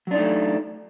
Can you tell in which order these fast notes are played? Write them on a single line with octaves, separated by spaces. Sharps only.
F#3 D4 D#4 A3